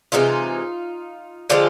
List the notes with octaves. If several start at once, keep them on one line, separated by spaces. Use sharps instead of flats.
C3 E3 G#3 D#4 F4
D3 F3 G#3 F4 G4